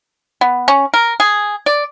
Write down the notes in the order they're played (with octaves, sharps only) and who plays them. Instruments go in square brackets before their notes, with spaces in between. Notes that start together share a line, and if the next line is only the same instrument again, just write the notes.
[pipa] B3
C#4
A#4
G#4
D5